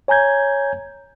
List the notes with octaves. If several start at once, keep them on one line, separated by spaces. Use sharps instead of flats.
C#5 G#5 A#5 G6 G#6